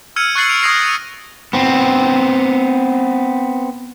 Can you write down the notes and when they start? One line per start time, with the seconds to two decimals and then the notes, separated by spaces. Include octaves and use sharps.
0.16 E6 F6 G#6 C#7 D#7
0.35 C#6 F#6 A6 C7 C#7 F#7
0.49 D7 F7
0.62 C#6 D#6 G#6 A#6 C7 D#7
0.85 D#7
1.53 B3 C4